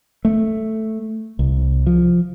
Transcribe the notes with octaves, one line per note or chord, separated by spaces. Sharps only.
A3
C2
F3